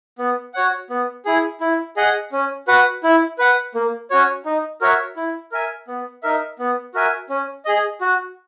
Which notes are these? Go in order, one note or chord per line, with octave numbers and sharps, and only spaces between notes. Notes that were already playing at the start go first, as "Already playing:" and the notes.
B3
F#4 C#5 F#5
B3
E4 G#4
E4
G#4 D#5 F#5
C#4
F#4 B4 F#5
E4
B4 F#5
A#3
C#4 F#4 C#5
D#4
F#4 A#4 C#5 E5
E4
A#4 E5 G#5
B3
D#4 A#4 E5
B3
F#4 A#4 E5 G#5
C#4
G#4 D#5
F#4